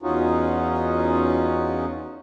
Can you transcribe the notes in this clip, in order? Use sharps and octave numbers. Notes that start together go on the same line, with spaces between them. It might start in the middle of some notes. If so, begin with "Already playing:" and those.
E2 C#4 D#4 F4 F#4